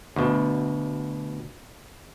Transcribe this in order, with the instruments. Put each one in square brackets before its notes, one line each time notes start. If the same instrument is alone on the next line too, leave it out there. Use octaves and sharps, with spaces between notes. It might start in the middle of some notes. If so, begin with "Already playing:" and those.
[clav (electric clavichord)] D2 B2